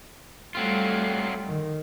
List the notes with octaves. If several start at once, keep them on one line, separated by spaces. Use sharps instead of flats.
F#3 G3 A3 C4 F4
D#3